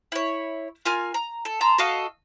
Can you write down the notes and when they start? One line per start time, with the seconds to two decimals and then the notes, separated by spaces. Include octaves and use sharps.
0.12 E4 C#5
0.85 F4 A#4 G#5 F6
1.14 A#5
1.45 A4
1.61 A5 A#5 C6 E6
1.78 F#4 A4 D#5 F5